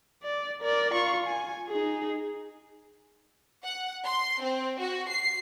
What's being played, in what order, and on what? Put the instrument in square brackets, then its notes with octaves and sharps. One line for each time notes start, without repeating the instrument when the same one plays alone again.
[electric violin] D5
A#4 D5
F4 C#6
G#5
D#4 G#4
[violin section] F#5
C6
C4
F#4
C7